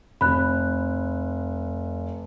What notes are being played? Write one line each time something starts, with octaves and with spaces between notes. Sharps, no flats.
F1 B5 F#6